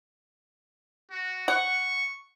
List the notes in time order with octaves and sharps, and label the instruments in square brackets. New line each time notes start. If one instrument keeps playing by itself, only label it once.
[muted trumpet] F#4
[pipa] F#5 [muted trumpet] C#6